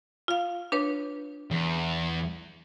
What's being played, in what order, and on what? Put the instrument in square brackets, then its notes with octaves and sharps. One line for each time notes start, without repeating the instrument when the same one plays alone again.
[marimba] F4 F5
D4 B4 C#5
[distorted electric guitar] E2